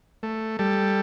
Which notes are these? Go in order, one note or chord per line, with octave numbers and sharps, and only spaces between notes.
A3
G3 A4